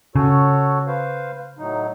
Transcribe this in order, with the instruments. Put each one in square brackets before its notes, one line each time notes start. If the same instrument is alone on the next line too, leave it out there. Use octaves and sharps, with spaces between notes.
[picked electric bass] C#3 [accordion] F#4 A4 C#5
[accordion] B4 C5 F5
A2 F#3 D#4